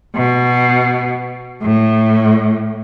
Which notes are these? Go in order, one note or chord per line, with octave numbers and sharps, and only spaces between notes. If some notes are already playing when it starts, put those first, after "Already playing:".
B2
A2